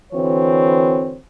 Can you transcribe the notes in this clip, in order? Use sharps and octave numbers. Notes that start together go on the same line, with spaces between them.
D3 E3 C4 F#4 C#5